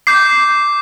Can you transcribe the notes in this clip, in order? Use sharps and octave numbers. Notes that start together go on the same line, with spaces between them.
D6 G6 C7